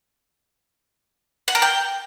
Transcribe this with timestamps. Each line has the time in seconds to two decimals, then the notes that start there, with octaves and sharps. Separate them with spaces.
1.48 F#5
1.55 A#4
1.62 G5